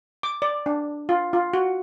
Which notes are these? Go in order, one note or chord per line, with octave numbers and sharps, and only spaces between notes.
D6
D5
D4
F4
F4
F#4